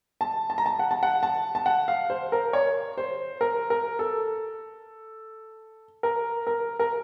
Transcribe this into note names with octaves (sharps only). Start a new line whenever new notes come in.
A5
A5
A#5
A5
F#5
A5
F#5
A5
A5
F#5
F5
C5
A#4
C#5
C5
A#4
A#4
A4
A#4
A#4
A#4